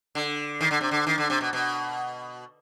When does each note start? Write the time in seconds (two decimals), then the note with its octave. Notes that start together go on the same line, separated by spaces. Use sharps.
0.15 D3
0.61 D#3
0.71 D3
0.81 C3
0.91 D3
1.07 D#3
1.18 D3
1.30 C3
1.41 B2
1.53 B2